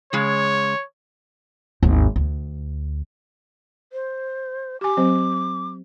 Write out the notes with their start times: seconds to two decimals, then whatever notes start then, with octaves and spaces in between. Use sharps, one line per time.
0.13 C#3 G#3 C#5
1.83 G#1 D#2
2.16 D2
3.93 C5
4.81 G4 G#5 D6
4.97 F#3 C4 C5